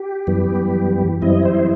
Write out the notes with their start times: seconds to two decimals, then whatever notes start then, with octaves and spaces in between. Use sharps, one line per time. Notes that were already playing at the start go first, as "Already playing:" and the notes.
Already playing: G4
0.27 F#2 E3 G3 B3
1.22 F#2 E3 G3 C4 E4 D#5
1.45 C5